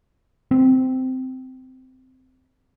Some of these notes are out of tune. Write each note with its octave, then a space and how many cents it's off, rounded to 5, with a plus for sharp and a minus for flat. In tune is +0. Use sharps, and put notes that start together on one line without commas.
C4 -15